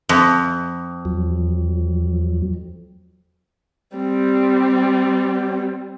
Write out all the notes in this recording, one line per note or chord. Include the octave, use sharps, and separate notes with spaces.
F2
E2 F3 F#3
G3 C4